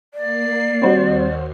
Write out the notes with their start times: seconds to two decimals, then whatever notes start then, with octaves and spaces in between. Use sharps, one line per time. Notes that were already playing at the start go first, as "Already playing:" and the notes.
0.14 A#3 D5 C7
0.82 D#2 G3 C4 F#4 C5 C#5